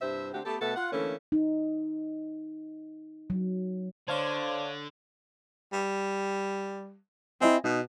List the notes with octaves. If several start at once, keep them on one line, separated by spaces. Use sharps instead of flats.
G2 C3 E4 C5 E5
D3 A3 C4 F#4 G4
A3 B3 G4 A4
B2 A3 B3 F#4 A4
F4 F#5
D3 E3 A3 A#3 C#4
D#4
F#3
D3 D4 C5 C#5 F5 G#6
G3
C4 E4 D#5 G#5
B2 D#4